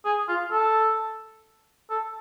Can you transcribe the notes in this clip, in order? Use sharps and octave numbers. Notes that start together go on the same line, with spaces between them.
G#4
F4
A4
A4